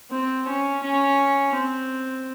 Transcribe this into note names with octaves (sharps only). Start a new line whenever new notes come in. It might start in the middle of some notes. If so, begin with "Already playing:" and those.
C4
C#4
C#4
C4